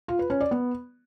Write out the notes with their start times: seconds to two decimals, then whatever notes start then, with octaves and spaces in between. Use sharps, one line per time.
0.08 F4
0.19 B4
0.30 C#4
0.41 D5
0.51 B3